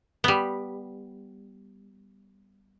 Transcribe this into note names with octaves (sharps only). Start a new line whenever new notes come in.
G3 B3